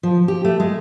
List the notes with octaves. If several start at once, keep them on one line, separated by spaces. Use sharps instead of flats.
F3
G4
A3
G#3